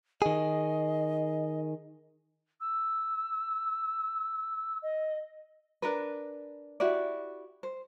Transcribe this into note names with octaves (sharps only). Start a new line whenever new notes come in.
D#3 G#4 D#5
E6
D#5
D4 A#4 B4
E4 F#4 G4 D5
C5